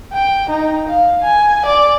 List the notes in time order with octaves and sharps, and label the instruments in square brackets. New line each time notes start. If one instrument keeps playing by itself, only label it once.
[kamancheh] G5
D#4
F5
G#5
D5